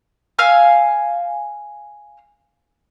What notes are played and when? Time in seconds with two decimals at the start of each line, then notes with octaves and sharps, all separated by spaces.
0.39 F5 G#5 E6 F6